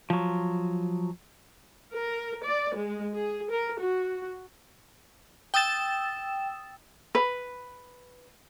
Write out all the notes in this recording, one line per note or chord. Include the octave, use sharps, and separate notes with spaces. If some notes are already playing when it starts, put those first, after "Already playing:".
F3 F#3
A#4
D5
G#3
G#4
A#4
F#4
G5 D#6 E6 A6 E7
B4